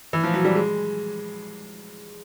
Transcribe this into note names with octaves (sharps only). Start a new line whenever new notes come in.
E3
F3
F#3
G3
G#3